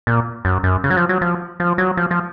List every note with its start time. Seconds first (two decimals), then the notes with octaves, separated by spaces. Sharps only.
0.07 A#2
0.45 F#2
0.64 F#2
0.84 C#3
0.90 F#3
0.97 F3
1.09 F#3
1.21 F3
1.60 F3
1.78 F#3
1.97 F3
2.11 F3